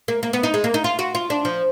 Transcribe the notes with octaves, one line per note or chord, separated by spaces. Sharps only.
A#3
A#3
B3
D#4
G#3
A#3
D#4
F4
F#4
F4
D4
F3